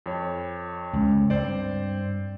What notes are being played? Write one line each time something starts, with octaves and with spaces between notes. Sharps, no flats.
F2 C#5
C#2
G2 C4 C5 D5